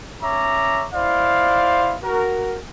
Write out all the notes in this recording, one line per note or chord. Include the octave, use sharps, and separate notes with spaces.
C#4 C#5 E5 A#5 D6
E4 C5 D5 F5
F#4 A#4